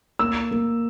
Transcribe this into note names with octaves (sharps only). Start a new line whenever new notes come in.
A#3 E6
A#3